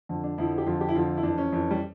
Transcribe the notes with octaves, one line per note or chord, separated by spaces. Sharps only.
F2 D3 F3
D4
F2 D3 F3 E4
G4
F2 D3 F3 F4
G4
E4
F2 D3 F3 F4
E4
F2 E3 D4
C#4
F2 E3
G3